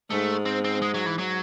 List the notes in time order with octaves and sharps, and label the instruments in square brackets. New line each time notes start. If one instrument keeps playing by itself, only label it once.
[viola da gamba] G#2 [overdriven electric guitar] A3
[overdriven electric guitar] C4
C4
G#3
F#3
E3
F#3